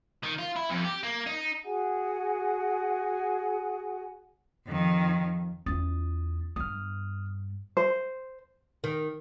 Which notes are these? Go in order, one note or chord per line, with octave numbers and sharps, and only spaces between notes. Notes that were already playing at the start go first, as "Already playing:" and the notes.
D#3
F4
E4
F2
G4
A#3
D#4
F#4 G#4 F#5 G#5
F2 D#3
E2 C#4 F4 D#6 A6
G2 B3 D#6 F6
C5
D#3